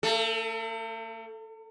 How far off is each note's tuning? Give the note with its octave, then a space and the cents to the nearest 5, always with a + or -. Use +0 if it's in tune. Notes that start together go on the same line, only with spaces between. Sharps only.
A3 +45 A4 +0